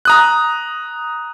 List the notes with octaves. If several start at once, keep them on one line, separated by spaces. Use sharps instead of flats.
A#5 D#6 F#6